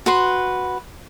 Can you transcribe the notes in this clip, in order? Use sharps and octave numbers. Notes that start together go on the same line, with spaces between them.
F#4 B4 C6